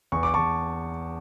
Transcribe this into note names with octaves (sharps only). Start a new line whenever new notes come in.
E2 C#6
D6
E2 A5 C#6